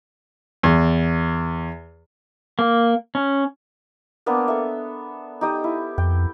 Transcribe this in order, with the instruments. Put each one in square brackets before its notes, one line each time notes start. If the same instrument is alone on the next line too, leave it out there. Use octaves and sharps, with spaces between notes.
[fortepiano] E2
[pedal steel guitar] A#3
C#4
[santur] A#3 B3 D4
A4 E5
D#4 G4 D#5
E4
[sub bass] F2 [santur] G5